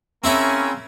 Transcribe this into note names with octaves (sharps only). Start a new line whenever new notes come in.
C#3 A#3 C4 C#4 E4 B5